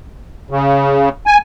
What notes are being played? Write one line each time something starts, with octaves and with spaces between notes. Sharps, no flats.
C#3
G#5